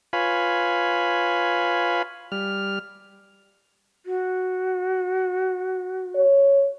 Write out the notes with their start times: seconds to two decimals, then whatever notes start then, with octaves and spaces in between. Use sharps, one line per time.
0.13 F4 B4 C#5 F5 G#5 B5
2.32 G3 F6
4.06 F#4
6.15 C#5